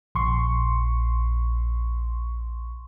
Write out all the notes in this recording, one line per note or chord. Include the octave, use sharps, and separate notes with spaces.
A#1 C6 C#6